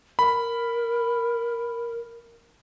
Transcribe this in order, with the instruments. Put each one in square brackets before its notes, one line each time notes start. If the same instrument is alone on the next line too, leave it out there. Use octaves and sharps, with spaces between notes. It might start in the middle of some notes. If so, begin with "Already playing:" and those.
[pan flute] A#4 [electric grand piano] B5